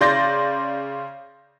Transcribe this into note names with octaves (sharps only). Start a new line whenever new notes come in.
C#3 D5 C6 G6 A6 A#6